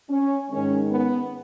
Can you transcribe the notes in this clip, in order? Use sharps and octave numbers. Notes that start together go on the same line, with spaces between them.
C#4
G#2 D#3 G#3 C#4
B3